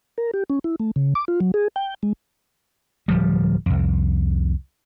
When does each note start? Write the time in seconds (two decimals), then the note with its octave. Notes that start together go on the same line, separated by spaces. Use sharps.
0.18 A#4
0.34 G4
0.50 C#4
0.64 E4
0.80 A3
0.96 C#3
1.15 D6
1.28 F4
1.40 F#3
1.54 G#4
1.76 G5
2.03 G#3
3.08 D1 F3 G3
3.66 C2 F2